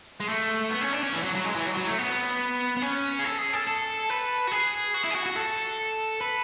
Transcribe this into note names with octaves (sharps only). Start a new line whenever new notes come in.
G#3
A3
B3
C#4
D4
C#4
E3
F#3
F#3
G#3
E3
F#3
F#3
A3
B3
B3
C#4
G#4
A4
G#4
A4
A4
B4
F#4
G#4
F#4
E4
G#4
F#4
F#4
A4
B4